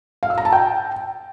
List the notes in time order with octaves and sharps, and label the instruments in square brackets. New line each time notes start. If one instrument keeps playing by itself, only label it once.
[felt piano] F5
E6
A#5
A5
G5